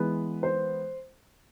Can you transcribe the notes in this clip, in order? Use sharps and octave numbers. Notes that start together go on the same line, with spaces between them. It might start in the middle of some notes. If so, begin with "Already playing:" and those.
Already playing: E3 G#3 B3 B4
C5